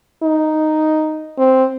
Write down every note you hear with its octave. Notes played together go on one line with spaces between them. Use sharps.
D#4
C4